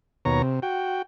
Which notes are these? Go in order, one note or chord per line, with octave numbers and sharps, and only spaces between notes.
D#2 B2 C#5 A#5
C3
F#4 G5